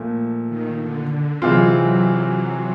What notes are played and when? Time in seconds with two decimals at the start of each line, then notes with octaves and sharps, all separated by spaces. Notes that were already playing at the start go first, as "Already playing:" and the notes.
Already playing: A#2 F3 A3
0.48 D#3
0.79 D3
1.10 D3
1.41 C3 E3 F#3 G#3 C4 F4